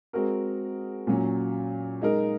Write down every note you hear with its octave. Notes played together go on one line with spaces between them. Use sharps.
G#3 C4 F#4 A#4
A#2 F#3 C#4
G#3 D#4 A#4